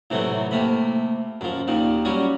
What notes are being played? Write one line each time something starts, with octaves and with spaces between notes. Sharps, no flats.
A2 C3 E3 F#3 A3
C3 A3 A#3 B5
F#2 F3
D#2 A#2 D#3
F#3 G3 C#4